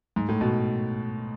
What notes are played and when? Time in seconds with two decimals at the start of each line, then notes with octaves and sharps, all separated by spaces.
0.16 G#2
0.29 A2
0.41 B2